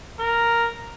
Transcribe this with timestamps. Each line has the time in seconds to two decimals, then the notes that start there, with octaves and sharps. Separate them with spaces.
0.20 A#4